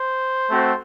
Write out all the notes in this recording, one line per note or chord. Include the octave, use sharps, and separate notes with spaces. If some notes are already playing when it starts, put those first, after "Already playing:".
Already playing: C5
A3 C4 F#4